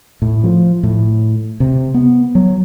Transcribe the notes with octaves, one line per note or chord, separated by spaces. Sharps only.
A2
F3
A2
C3
B3
F#3